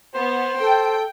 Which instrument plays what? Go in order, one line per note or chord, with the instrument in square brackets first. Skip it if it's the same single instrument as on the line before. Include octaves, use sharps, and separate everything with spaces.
[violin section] B3 [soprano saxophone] C5
[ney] A4 [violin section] G5